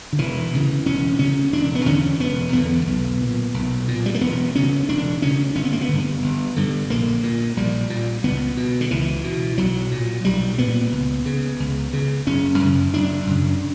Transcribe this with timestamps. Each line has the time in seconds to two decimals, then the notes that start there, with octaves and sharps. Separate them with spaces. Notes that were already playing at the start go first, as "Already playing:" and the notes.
0.13 D3
0.19 E1 E3
0.53 D2 C#3
0.86 E1 C#4
1.19 D2 C#3 C#4
1.53 E1 D4
1.75 B3
1.86 E2 D3 C#4
2.20 E1 B3
2.53 E2 D3 B3
2.87 B1
3.21 A#2
3.54 B1
3.88 A#2
4.06 G3
4.14 A#3
4.21 E1 B3
4.55 D2 C#3 C#4
4.89 E1 D4
5.22 D2 C#3 C#4
5.55 G1 C#4
5.64 B3
5.73 A#3
5.81 B3
5.88 G2 D3
6.22 G1
6.56 G2 D3
6.90 A#1 A#3
7.23 A#2
7.57 A#1 G3
7.90 A#2
8.24 C#2 B3
8.57 B2
8.81 D3
8.91 C#2 E3
9.24 B2
9.58 B1 F#3
9.91 A#2
10.25 B1 G3
10.58 A#2 B3
10.92 C#2
11.26 C#3
11.60 C#2
11.93 C#3
12.27 F#1 C#4
12.59 F#2 C#3
12.94 F#1 D4
13.27 F#2 C#3